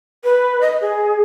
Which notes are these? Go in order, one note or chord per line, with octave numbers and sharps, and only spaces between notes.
B4
D#5
G#4